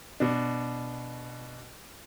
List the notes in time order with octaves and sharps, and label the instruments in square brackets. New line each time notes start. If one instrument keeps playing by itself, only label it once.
[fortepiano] B2 D4